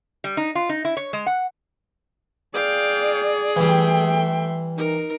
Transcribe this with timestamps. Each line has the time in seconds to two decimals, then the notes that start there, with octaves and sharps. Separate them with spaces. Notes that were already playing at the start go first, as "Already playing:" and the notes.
0.24 G3
0.37 D#4
0.55 F4
0.69 D#4
0.85 E4
0.97 C#5
1.13 G#3
1.26 F#5
2.54 G#4 D5 F5 G5
3.57 E3 G3 A3 E5 G5 C6
4.77 D#4 A#4